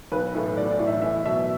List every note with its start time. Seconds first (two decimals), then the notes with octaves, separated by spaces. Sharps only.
0.12 B1 B4
0.34 A2 E3 A3
0.57 B1 D5
0.72 D5
0.79 A2 E3 A3
0.87 E5
1.02 E2 E5
1.25 B2 F#3 E5